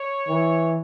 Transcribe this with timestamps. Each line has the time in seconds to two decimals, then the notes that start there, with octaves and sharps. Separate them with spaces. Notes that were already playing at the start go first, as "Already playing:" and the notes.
Already playing: C#5
0.29 E3